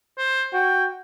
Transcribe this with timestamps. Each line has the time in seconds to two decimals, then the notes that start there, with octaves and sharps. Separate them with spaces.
0.18 C5
0.53 F#4 G5